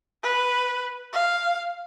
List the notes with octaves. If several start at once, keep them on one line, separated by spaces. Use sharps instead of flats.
B4
F5